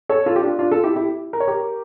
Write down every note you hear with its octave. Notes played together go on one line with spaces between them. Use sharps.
A4 C#5
F4 A4
G4
D4 F4
D4 F4
F4 A4
E4 G4
E4 G4
A#4
C#5
G4 A#4